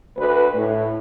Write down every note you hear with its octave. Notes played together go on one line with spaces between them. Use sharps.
D2 B4
A2